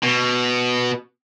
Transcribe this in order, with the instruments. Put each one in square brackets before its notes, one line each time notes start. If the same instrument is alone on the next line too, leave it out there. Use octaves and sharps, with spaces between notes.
[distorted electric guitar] B2